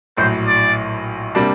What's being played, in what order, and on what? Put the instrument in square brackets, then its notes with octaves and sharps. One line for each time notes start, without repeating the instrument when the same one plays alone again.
[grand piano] A#1 A2 F#3 [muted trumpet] C5
[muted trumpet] D5
[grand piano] C3 G3 A#3 D4